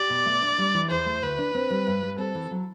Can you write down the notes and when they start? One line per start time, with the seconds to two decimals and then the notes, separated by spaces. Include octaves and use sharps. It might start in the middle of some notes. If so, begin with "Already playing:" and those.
Already playing: G4 D5
0.10 B2
0.26 A3
0.42 D4
0.58 G3
0.74 E3
0.90 E2 C5
1.06 A3
1.22 D2 B4
1.39 D4
1.55 C4
1.70 G3
1.87 G2
2.03 G3
2.18 C4 A4
2.35 E3
2.51 F#3